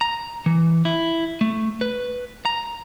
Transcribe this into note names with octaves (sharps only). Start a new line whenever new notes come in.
A#5
E3
E4
A3
B4
A#5